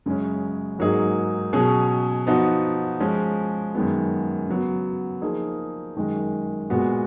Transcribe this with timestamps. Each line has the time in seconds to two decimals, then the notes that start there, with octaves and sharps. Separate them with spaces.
0.06 F#2 C#3 G#3 C#4
0.79 G#2 F#3 A#3 D#4 G#4
1.53 B2 F#3 C#4 G#4
2.27 F3 B3 D#4 F#4
3.00 F3 G#3 C#4
3.74 F#2 D#3 G#3 B3
4.48 C#3 F#3 B3
5.22 F3 A#3 D#4 G#4
5.96 F#2 D#3 G#3
6.70 A#2 G#3 B3 F#4